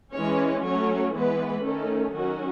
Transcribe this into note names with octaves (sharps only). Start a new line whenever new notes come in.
E3 G#3 C#4 C#5
F#3 A3 C#4 C#5
E3 G#3 B3 B4
D#3 A3 C#4 A4
D#3 F#3 C#4 F#4